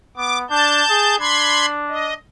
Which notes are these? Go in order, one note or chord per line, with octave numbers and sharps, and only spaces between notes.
B3 D6
D4 A5 G6
G#4
D4 B5 C6 G#6
D#5